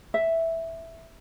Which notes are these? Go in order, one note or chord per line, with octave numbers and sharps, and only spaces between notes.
E5